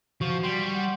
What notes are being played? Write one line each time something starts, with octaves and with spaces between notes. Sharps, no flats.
F3 F#4 C#6
G3 C6 G6 D7
F#5